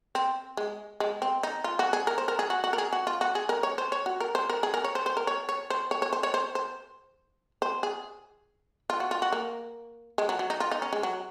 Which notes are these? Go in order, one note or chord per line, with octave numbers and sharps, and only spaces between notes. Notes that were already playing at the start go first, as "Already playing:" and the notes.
C4
G#3
G#3
C4
D#4
F4
F#4
G#4
A#4
C5
A#4
G#4
F#4
F#4
A#4
G#4
F#4
F4
F#4
G#4
A#4
C#5
C5
C#5
F#4
A#4
C5
A#4
G#4
A#4
C#5
C5
C5
A#4
C#5
C#5
C5
C#5
C#5
C5
C#5
C5
C5
C5
G#4
F4
F#4
F4
F#4
A#3
G#3
F#3
F#3
D#4
F4
D#4
C#4
G#3
F#3